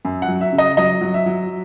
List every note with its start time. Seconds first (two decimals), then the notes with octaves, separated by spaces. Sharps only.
0.05 F#2
0.22 F#5
0.28 F#3
0.41 E5
0.52 C#3
0.58 D#5
0.77 F#3 D#5
1.01 F#3
1.14 E5
1.26 F#3